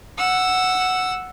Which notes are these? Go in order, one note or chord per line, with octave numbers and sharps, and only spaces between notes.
F#5 E6